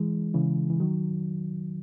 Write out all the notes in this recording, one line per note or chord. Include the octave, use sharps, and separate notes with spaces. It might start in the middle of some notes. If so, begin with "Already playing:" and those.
Already playing: E3 G#3
C#3 E3
E3
D#3 F#3